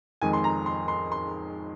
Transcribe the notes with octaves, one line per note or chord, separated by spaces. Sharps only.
F2 D#3 G#3 G#5
C6
A#5
C6
C6
C6